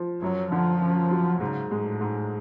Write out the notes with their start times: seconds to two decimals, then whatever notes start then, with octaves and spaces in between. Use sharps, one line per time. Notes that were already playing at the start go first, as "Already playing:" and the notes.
Already playing: F3
0.22 F#2 F#3
0.52 D3 F3
0.81 C#4
1.11 F#3
1.40 G#2 C#3
1.71 A2 G#3
2.01 G#2